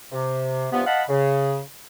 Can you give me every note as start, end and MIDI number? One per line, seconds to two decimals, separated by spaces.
0.12 0.67 48
0.72 0.81 43
0.72 0.81 48
0.72 0.81 53
0.72 0.81 59
0.86 1.02 75
0.86 1.02 77
0.86 1.02 78
0.86 1.02 81
0.86 1.02 83
1.08 1.59 49